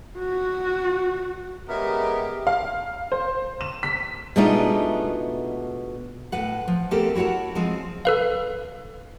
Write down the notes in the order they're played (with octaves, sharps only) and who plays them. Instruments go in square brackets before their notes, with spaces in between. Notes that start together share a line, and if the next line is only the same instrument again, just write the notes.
[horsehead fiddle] F#4
[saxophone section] C#3 G#3 B3 [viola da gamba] G4 [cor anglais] A#4 [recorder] E5
[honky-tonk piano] F5
C5
E7
B6
[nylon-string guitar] B2 G#3 A3 D4 D#4 F4
A2 B4 F#5
F3
A3 B3 C4 G4 A4 A#4
E4 F#4 C#5 F#5 A5
F3 G#3 C4 F4
[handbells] A4 B4 F5